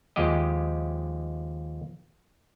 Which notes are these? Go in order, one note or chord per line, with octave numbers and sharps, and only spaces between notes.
D#2 F3 G#3 G4 D#5